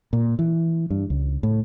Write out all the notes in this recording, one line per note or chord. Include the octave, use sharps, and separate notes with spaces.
A#2
E3
G2
C#2
A2